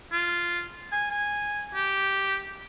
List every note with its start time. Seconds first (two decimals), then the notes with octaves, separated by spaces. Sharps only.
0.12 F4
0.92 G#5
1.11 G#5
1.74 G4